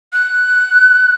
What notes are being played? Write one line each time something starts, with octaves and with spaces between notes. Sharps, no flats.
F#6